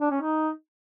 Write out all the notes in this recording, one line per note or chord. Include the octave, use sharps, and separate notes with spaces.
D4
C#4
D#4